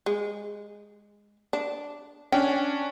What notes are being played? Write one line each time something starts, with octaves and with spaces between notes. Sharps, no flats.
G#3
D4
C#4 D4 G5